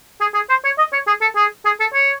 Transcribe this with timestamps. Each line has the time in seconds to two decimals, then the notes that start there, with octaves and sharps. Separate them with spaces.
0.21 G#4
0.34 G#4
0.49 C5
0.64 C#5
0.78 D#5
0.93 C#5
1.07 G#4
1.21 A4
1.36 G#4
1.65 G#4
1.80 A4
1.94 C#5